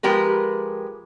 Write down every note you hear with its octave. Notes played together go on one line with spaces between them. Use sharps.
F3 G#3 G4 A#4 B4